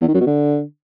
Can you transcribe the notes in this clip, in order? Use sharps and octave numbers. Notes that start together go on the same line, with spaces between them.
E2
D#3
F#2
B2
D3